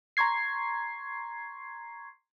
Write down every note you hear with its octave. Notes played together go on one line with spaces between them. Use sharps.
A#5 C6 C#6 G#6 C7